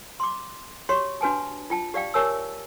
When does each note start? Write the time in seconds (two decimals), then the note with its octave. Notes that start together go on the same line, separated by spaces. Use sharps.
0.20 C6 D6
0.89 F#4 G4 C#5 C6 C#6
1.21 D4 F#4 B4 G#5 A5
1.70 F4 G5 A5
1.94 G4 D5 F5 G5
2.14 G4 A#4 C#5 G#5 A5 E6